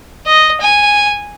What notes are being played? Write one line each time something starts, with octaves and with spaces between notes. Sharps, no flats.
D#5
G#5